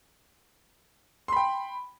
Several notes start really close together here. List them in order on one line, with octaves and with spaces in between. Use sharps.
C6 B5 G5